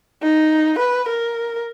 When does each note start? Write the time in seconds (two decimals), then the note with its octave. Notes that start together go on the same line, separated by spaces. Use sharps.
0.22 D#4
0.79 B4
1.08 A#4